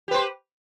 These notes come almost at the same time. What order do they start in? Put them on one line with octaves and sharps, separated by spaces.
G4 B4 C5